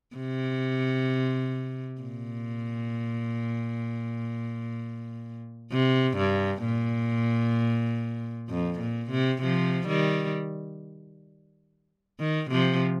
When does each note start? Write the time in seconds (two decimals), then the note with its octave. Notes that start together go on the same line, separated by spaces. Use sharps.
0.16 C3
2.01 A#2
5.72 C3
6.18 G2
6.64 A#2
8.49 F2
8.80 A#2
9.11 C3
9.42 C3 F3
9.88 D#3 G3
12.19 D#3
12.50 C3 F3